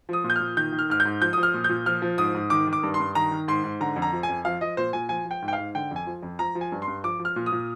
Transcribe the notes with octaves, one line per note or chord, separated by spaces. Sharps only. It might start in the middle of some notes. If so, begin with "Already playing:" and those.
F3 D#6
A#2
G6
A#2 F6
D#3 G6
D#3
F6
G#2 F6
G6
G#2
F3 G6
F3 D#6
F6
A#2
G6
A#2
F3 F6
F3
G#2 D#6
G#2
D#3 D6
D#3
D6
G2
C6
G2
D#3 A#5
D#3
G#2 C6
G#2
D3 A#5
F2
A#5
F3
G#5
F2
F3 F5
F3 D#5
A#2 C5
A#2 G#5
F3 G#5
F3
G5
G#2
G5
F5
G#2
D3 G5
F2 G#5
F3
F2
F3 A#5
F3
G#5
G2
C6
G2
F3 D6
F3
F6
A#2
D#6
A#2